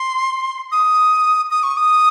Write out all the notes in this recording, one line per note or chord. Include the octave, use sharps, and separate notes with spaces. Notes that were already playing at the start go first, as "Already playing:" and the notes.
Already playing: C6
D#6
D#6
C#6
D#6